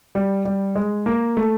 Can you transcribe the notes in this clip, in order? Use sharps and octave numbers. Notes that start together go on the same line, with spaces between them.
G3
G3
G#3
A#3
A3